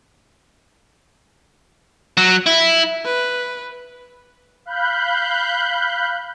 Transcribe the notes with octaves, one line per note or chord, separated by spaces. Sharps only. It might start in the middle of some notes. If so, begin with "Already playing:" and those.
F#3
E4
B4
F5 B5 F#6 G6